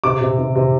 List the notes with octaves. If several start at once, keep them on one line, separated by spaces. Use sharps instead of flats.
C3 D6
C3
C3
C3